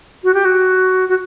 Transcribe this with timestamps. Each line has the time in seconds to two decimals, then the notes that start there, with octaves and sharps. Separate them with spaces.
0.24 F#4
0.34 G4
0.45 F#4
1.09 F#4